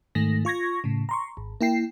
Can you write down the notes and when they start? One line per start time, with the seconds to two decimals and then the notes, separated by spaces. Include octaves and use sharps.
0.15 G#2 D#3 A3 A#6
0.45 F4 C#6 G#6 A#6
0.84 A2 C#3
1.09 A#5 C6 C#6
1.37 G#1
1.61 A#3 E4 G5 C7